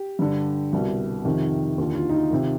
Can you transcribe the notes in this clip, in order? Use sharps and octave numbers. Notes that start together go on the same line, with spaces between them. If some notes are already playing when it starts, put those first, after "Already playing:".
Already playing: G4
G2 D3
C2 B2
F2 C3 D#3
D#2 D3 F4
F4
D#4
F4
C3 D#3